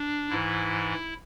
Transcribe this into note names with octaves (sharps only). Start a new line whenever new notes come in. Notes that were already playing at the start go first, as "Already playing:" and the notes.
Already playing: D4
G#2 E3 E4